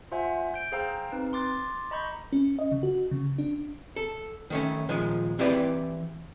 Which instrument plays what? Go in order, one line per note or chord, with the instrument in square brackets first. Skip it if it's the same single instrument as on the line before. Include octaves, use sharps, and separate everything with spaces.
[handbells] F4 C5 E5 F#5 G#5
G6 D7
G#4 C5 F5 G5 A#5 E6
C4 D#4 B4
C6 D6 A6
D#5 A#5 B5 C#6 G6
[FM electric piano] C#4
D#5
C#3
F#4
C#3
D4
[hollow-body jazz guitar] A4
D#3 A3 C#4
A#2 D#3 F3 G#3
E3 C4 E4 G4 B4 D5